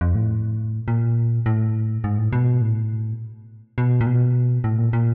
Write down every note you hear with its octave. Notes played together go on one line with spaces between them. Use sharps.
F2
A2
A#2
A2
G#2
A2
B2
A2
B2
A#2
B2
A2
A#2
A#2